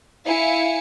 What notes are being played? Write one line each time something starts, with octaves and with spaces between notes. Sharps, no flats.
E4 F5 G#5 C#7